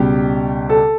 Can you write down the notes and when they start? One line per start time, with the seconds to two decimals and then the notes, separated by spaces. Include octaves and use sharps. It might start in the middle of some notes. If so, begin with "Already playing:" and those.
Already playing: C#2 B2 G3 G4
0.69 A4